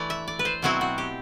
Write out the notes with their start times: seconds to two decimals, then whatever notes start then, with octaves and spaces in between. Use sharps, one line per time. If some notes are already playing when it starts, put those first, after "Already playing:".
Already playing: E3 A3 E4 D5
0.10 E5
0.28 D5
0.39 B4
0.45 C5
0.62 B2 F#3 C4 E4 F#4
0.81 F#4
0.98 G4